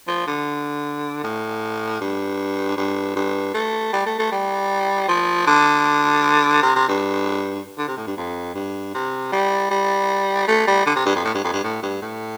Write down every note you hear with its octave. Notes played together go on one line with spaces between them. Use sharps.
F3
D3
A2
G2
G2
G2
A3
G3
A3
A3
G3
F3
D3
C3
C3
G2
D3
C3
A2
G2
F2
G2
C3
G3
G3
A3
G3
D3
C3
G2
F2
A2
G2
F2
G2
A2
G2
A2